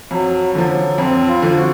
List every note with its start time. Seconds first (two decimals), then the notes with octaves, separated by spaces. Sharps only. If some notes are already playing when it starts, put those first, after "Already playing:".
0.11 F2 F#3
0.55 D3 F3 F#3
0.98 F2 C4
1.28 F4
1.42 D3 F3
1.57 F#4